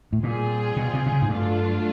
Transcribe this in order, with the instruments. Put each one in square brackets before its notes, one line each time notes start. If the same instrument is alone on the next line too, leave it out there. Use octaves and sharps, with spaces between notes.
[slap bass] A2
[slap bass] A#2 [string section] G3 C4 F4 G#4
[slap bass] B2
C3
C3
C#3
G#2
[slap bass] G2 [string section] F#3 A3 D4 F4